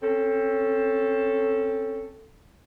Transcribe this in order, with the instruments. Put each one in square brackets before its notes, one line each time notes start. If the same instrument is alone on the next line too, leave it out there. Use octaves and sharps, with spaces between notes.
[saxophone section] C4 C#4 A4